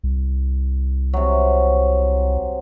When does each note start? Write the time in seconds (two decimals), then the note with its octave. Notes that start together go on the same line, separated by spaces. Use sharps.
0.04 C2
1.13 C3 F#3